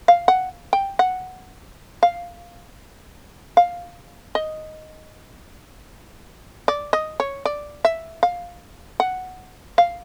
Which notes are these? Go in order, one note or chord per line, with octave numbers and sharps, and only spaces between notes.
F5
F#5
G5
F#5
F5
F5
D#5
D5
D#5
C#5
D5
E5
F5
F#5
F5